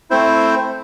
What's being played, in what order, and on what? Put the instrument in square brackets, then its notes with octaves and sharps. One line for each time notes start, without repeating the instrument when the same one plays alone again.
[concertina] A3 C4 E4 C5